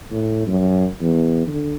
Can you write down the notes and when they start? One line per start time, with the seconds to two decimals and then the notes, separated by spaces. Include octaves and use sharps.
0.11 A2
0.47 F#2
1.00 E2
1.47 D3